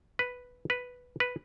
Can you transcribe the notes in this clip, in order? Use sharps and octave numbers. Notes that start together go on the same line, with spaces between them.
B4
B4
B4